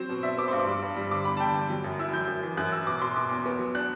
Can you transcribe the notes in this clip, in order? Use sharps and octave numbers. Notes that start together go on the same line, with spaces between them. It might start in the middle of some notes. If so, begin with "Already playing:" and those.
Already playing: F#3 C4 C5
B2
D4 E5
B3 D6
G2 C6
D6
G3
G2
G3
D3 D6
E2 B5
A5
D3 G5
E2
F#3
F#2
E4 E6
F#3 G6
F#2
E3
F#2 F#6
F#2 E6
B2 D6
B2 C6
B2 D6
E2
B3
F#3
D4 F#6